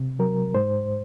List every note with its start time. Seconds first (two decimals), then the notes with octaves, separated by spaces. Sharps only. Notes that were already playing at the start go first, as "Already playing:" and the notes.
Already playing: C3
0.19 F#3 A#4
0.54 G#2 C5